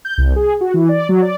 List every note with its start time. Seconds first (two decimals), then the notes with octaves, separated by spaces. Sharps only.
0.05 G6
0.18 C2
0.36 G#4
0.61 F#4
0.74 E3
0.89 D5
1.09 F#3
1.22 D5